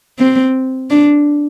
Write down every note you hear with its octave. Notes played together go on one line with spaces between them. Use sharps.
C4
D4